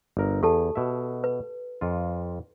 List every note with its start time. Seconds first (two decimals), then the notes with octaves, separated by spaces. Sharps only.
0.17 G1 A#4
0.43 E2 G4 A4 A5
0.76 B2 E5
1.24 B4
1.81 F2 F4